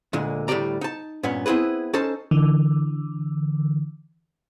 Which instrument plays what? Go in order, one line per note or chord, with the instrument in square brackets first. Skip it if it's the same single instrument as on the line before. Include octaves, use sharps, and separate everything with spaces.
[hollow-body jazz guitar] D2 A#2 D3 G#3
D2 A2 G3 G4 D5 A#5
D#4 A5
G2 A#2 B3 C#4
B3 C4 E4 G#4 B4
C#4 D#4 A4 C5 A5
[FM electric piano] D3 E3